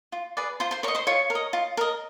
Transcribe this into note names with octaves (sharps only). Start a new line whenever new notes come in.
F4
G#4 B4 D5
F4 C5 C6
C5 C6
A#4 C#5 D#5 C#6
C5 C6
F4 C#5 C#6
A#4
D#5
F4
A#4 D#5